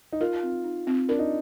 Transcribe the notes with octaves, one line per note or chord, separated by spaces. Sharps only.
D#4
F4 A#4
C4
D#4
C4
D4 A#4
D#4